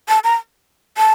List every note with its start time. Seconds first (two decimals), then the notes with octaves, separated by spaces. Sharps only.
0.09 A5
0.24 A#5
0.98 A5